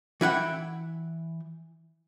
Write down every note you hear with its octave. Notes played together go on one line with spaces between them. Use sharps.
E3 E4 F#5 G5